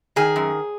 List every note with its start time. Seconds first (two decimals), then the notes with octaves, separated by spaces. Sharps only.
0.16 D#3 G#4
0.36 F#2